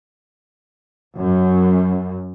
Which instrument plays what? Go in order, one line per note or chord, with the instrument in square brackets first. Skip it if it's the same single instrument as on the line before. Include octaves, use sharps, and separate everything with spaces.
[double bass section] F#2